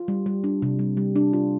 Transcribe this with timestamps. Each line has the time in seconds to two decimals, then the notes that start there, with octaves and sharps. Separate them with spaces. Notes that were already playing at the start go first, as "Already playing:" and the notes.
Already playing: F4
0.08 G3
0.26 G3
0.44 D4
0.62 C3
0.79 G3
0.97 G3
1.16 D4
1.33 F4